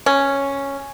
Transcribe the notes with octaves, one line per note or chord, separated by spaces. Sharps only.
C#4